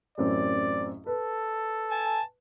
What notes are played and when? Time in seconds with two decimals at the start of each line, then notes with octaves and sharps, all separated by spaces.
0.18 A1 F#2 C4 D5
1.06 A4 B4
1.92 G#5 A5